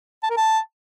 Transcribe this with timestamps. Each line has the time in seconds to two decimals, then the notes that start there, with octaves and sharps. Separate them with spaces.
0.23 A5
0.30 A#4
0.37 A5